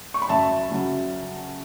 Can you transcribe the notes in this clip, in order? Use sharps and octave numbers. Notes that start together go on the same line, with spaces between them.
C#6
B5
F#2 E5 A5
C#3 F#3 C#4